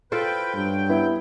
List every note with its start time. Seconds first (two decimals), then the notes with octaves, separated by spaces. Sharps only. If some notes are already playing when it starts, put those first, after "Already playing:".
0.12 F4 A4 B4 C5 G5
0.54 G2 F#3 G5
0.89 B3 E4